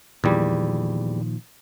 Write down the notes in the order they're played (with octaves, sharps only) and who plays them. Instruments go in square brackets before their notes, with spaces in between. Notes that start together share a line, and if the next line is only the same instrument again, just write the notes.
[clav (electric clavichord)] E2 G3 [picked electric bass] A#2 D#3 F3